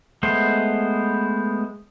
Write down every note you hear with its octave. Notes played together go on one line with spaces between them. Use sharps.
G#3 A3 B3 C5